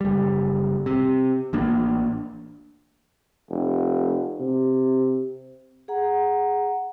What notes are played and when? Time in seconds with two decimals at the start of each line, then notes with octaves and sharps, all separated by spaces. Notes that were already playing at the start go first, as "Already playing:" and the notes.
0.01 F#1 G3
0.86 C3
1.53 A1 A#3 D4
3.50 F1
4.40 C3
5.88 G#4 F#5 A#5